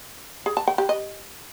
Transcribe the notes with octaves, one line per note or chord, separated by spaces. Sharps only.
G#4
A5
G5
G4
D#5